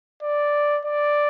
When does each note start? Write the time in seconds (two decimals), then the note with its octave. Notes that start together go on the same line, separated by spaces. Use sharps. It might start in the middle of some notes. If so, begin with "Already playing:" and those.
0.23 D5
0.85 D5